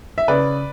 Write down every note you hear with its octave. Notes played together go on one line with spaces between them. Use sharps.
E5
C#3 B4 D5